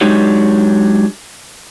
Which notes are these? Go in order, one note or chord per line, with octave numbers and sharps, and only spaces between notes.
F#3 G#3 D4 D#4 G4 C#5